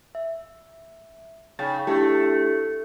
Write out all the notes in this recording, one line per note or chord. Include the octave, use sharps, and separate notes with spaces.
E5
C#3 D#4 G5 A6
A3 D4 E4 G4